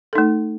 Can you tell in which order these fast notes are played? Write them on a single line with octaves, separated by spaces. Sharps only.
A4 D#4 A3